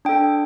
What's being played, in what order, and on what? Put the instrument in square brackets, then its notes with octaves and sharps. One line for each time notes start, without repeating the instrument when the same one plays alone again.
[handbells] D4 A4 G5